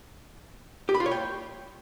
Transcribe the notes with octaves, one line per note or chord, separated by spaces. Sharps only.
G4
B5
F4
C#5
G5